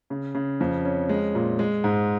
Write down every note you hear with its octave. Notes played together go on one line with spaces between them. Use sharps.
C#3
C#3
F2
C#4
G#3
A#2
G#3
G#2